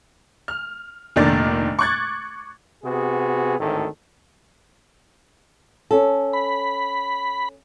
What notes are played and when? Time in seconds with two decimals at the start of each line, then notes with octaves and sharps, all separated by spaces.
0.48 F6
1.16 F1 A#2 D#3 D4 A6
1.79 C#6 D6 F#6 G#6 A6
2.84 C3 B3 F#4 G#4
3.58 G#1 D2 A2 D#3 A4
5.91 C#4 A4
6.33 B5